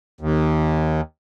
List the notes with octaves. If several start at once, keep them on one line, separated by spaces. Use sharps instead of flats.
D#2